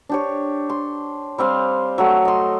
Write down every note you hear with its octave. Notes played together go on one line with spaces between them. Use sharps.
D4 G4 C#5
C6
G3 C4 F5 C6
F#3 A3 C#6
D#5 C6